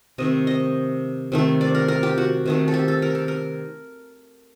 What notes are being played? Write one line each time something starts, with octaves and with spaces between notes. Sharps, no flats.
C3 D#3 A3 D#5
D#5
C3 D#3 A3
D5
A#4
A#4
G4
F#4
C3 D#3 A3
A4
G4
A4
A#4
A4
A#4